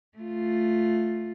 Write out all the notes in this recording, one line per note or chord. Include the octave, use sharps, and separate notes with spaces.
A3 F4